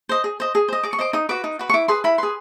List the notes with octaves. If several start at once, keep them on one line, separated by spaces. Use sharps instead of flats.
C5 D#5
G#4
C5 D#5
G#4
C5 D#5
G#4 D6
C#6
C5 D#5 D6
D#4 D#6
F#4 B4 D6
D#4
F#4 B4
C#6
E4 D6
G#4 B4 C6
E4 B5
G#4 B4 C6